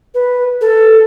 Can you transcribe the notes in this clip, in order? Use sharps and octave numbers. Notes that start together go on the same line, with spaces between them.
B4
A4